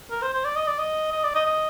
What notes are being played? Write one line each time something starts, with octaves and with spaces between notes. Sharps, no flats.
A#4
C5
C5
D5
D#5
D5
D#5
D#5
D5
D#5
D#5